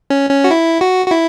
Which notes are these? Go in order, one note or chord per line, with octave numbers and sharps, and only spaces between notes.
C#4
C#4
F#4
E4
F#4
F#4
E4